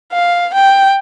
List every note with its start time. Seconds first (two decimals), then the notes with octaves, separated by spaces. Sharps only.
0.13 F5
0.54 G5